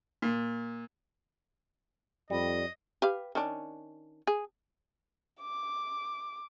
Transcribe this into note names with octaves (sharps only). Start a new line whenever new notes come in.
A#2
F2 G3 D#5
G4 B4 F5
D#3 C#4 D4
G#4
D6